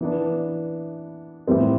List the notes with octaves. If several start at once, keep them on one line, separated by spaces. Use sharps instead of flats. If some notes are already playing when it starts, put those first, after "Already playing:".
E3 B3 D4
A2 E3 G3 C4